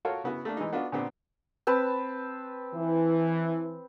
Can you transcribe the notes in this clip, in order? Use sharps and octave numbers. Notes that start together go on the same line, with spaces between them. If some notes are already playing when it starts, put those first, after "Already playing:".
F4 F#4 A4 A#4 C#5 F5
C#3 B3 E4 F#4
A3 A#3 D4
E3 G#3 D#4
B3 D4 F4 F#4
A#2 D3 B3 C4
C4 B4 A5
E3